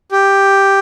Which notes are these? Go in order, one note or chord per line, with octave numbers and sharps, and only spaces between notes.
G4